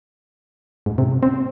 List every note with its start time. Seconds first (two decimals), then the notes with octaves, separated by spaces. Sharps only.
0.86 G#2
0.98 C3
1.23 C4